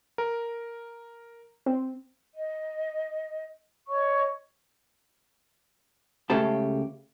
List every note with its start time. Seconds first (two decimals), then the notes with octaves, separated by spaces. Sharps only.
0.18 A#4
1.66 C4
2.34 D#5
3.87 C#5 D#5 C#6
6.30 C#2 C#3 A3 G4 A5